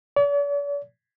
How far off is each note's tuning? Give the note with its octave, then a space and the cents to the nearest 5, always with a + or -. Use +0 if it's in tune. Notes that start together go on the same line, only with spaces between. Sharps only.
D5 -45